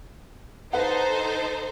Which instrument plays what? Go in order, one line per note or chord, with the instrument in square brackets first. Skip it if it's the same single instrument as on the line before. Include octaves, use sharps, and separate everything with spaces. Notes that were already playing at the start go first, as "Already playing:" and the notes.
[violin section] D#4 A4 C5 [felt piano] B4 F#5